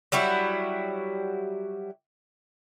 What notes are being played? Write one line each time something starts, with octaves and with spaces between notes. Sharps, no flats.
F#3 G3 E4 F#4